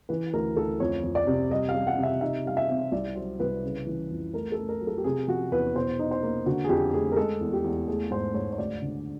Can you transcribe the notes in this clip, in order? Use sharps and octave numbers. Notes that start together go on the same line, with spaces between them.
E3 B4
D2 A#4
D2 A4
F2 C#5
F2
D5
C3
G3 D#5
F5
G3
F#5
C3
E5
D#4 E5
G3 F5
E5
C4
C2 D5
F#3 C5
C2 B4
C#3
E3
F2
A3 A#4
A4
A3
A#4
F#3
A4
G4
C3 G#4
F3 F#4
E2 B4
B2 C5
D#4
C5
A#3
D3 F#4
G#4
F2 G4
A3 G#4
A#4
G#3 A4
E2
G4
E2
A3 G#4
G#2 C5
G#2 C#5
C#5
D2 D5
D3